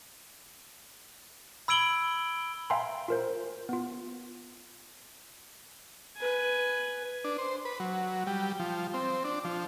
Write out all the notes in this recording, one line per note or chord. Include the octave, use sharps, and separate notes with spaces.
B5 E6 G#6 D7 F#7 G7
E5 F5 G5 G#5 A#5 C6
F4 A#4 C5
B3 F4
B4 G#5
D4
C5
B4
F#3
G3
F3
C4
D4
F3